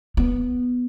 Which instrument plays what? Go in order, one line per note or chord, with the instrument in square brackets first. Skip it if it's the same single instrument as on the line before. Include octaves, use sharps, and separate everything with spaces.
[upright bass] B3